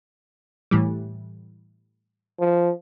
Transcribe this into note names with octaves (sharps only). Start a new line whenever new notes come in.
A2 E3 G3
F3